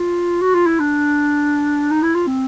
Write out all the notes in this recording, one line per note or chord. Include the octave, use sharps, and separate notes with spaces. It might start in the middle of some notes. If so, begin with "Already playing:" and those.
Already playing: F4
F#4
F4
E4
D4
D#4
E4
F4
C4